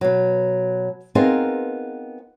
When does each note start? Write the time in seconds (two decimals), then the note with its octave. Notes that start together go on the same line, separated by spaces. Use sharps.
0.01 B2 F#3
1.15 B3 C4 D#4 F4 G#4 A#4